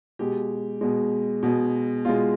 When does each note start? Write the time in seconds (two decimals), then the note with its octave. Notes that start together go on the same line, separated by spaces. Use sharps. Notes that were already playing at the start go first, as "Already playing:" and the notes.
0.19 B2 G#3 G4
0.81 B2 G#3
1.43 B2 G#3
2.05 B2 G#3 F4